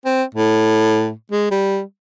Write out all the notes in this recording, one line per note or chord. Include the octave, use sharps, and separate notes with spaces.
C4
A2
G#3
G3